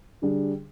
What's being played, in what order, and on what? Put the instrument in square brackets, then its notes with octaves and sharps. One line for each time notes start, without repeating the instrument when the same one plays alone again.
[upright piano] D3 G3 D4 G#4